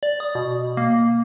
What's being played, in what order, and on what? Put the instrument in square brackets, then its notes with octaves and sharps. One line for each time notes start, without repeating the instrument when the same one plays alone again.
[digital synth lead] D5
D#6
B2
A#3